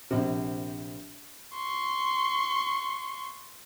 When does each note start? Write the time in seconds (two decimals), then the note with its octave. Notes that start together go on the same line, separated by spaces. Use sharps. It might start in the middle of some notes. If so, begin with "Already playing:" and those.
0.11 A#1 C3
1.54 C6 C#6